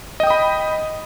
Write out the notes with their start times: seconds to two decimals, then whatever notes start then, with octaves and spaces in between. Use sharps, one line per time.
0.20 D#5
0.23 G5
0.27 D#6
0.30 B5